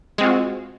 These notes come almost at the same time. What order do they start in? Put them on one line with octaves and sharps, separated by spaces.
G#3 C4 F4 F#4